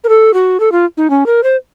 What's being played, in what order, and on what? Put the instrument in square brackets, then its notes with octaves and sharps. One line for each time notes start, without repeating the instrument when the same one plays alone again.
[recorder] A#4
A4
F#4
A4
F4
D#4
C#4
A#4
C5